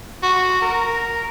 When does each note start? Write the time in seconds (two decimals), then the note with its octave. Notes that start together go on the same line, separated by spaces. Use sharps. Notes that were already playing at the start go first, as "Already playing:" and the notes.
0.23 F#4
0.62 A#4